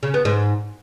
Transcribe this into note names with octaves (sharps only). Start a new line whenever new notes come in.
C#3
B3
G#2